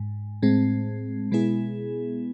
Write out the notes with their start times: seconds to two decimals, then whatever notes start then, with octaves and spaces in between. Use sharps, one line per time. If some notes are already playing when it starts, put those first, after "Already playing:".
Already playing: G#2
0.42 A2 G#3 C4
1.31 B2 G#3 B3 E4 G#4